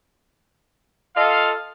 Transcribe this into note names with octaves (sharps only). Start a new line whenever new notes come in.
F4 A4 D#5 F5